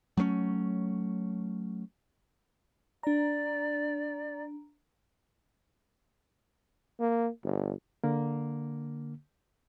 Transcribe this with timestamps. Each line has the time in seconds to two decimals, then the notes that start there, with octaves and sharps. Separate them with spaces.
0.17 F#3 A3 B3 C#4
3.03 D4 D5 A#5
7.00 A#3
7.44 G1
8.04 D3 A#3